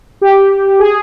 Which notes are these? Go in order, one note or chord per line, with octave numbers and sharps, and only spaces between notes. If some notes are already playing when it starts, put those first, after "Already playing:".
G4
G#4